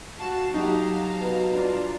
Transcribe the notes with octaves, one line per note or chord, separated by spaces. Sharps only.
F#4 F5 A5
F#3 D#4 F#4 G4 F5 A5 A#5
B2
D4 F4